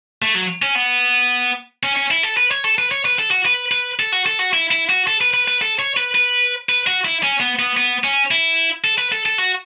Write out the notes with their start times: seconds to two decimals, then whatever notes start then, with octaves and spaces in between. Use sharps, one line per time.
0.22 A3
0.35 F#3
0.62 C#4
0.75 B3
1.83 C#4
1.96 C#4
2.11 E4
2.23 A4
2.37 B4
2.51 C#5
2.64 A4
2.78 B4
2.92 C#5
3.05 B4
3.19 A4
3.31 F#4
3.46 B4
3.72 B4
3.99 A4
4.12 F#4
4.26 A4
4.39 F#4
4.53 E4
4.71 E4
4.90 F#4
5.07 A4
5.21 B4
5.34 B4
5.48 B4
5.61 A4
5.79 C#5
5.97 B4
6.15 B4
6.69 B4
6.87 F#4
7.05 E4
7.23 C#4
7.40 B3
7.59 B3
7.77 B3
8.04 C#4
8.31 E4
8.84 A4
8.98 B4
9.12 A4
9.26 A4
9.38 F#4